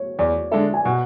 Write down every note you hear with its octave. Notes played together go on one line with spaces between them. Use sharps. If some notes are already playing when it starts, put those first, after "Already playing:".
Already playing: C#5
E2 D5
D3 G#3 D4 A4 E5
G#5
B2 F#5